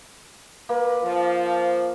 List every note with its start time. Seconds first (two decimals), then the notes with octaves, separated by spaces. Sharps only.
0.69 A#3 B4
1.03 F3